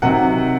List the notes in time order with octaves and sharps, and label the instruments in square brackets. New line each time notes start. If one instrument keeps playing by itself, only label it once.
[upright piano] C3 D#3 F#3 F#5